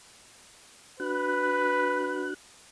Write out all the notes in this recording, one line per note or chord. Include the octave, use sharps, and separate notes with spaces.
D4 F#4 B4 F#6